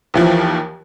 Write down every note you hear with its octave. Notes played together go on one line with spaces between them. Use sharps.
D#2 E3 F3